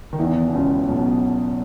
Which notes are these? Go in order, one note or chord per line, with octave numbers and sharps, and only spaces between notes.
D#3
E2 E3
B2
C#2 C#3
B1 B2